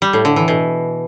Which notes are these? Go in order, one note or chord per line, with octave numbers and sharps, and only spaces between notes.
G3
A2
D3
E3
B2